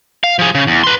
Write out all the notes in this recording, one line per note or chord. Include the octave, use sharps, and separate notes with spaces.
F5
F3 G#4
C#3
E2
B4 C6